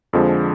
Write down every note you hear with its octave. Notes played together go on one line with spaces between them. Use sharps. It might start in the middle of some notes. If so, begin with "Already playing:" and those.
F2 D3 F3 G#3